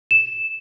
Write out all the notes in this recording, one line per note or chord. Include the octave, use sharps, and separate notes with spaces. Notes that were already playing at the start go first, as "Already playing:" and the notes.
E7